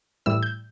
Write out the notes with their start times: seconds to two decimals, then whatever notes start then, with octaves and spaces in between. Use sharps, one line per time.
0.26 A2 E3 G3 E4 E6
0.43 G6